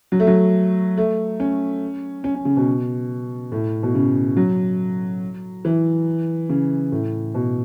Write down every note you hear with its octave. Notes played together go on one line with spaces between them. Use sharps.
F#3
A3
F#3
A3
C#4
C#4
C#4
C#3
B2
A2
B2
C#3
F#3
E3
C#3
A2
B2